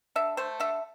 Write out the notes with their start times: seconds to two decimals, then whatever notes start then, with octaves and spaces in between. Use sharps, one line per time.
0.16 D3 E5
0.37 A3 C5
0.60 D3 E5